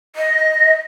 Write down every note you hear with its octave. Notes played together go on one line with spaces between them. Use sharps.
D#5